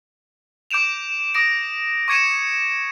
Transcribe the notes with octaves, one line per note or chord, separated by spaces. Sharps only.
D6 G6 D7 E7 F7
D6 D#6 A#6 D7
C#6 D6 G#6 C#7 D#7 E7